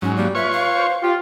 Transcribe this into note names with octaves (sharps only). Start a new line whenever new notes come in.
G#2 F#3 C#4
G3 A#3
F4 B4 C#5 E5 C#6
F5
C5
F4 G4